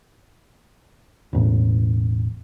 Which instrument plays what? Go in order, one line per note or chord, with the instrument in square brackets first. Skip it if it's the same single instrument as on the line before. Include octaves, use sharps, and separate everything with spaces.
[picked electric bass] E1 A1